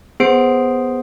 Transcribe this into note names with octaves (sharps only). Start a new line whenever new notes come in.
B3 G#4 C5 C7 D7